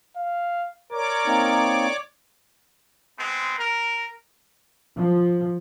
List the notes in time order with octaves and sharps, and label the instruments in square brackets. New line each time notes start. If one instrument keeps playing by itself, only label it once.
[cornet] F5
[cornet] A#4 [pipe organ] C#5 D5 D6
[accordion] A#3 C4 D#4
[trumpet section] G#3 B3 C4
A#4
[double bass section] F3